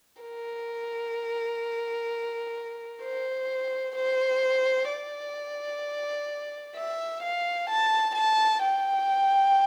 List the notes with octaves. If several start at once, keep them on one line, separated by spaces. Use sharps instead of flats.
A#4
C5
C5
D5
E5
F5
A5
A5
G5